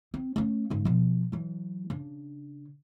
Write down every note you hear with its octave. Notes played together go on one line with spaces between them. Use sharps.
C4
A3 C#4
G#2 C#3
B2 F3
E3 F#3
C#3 D4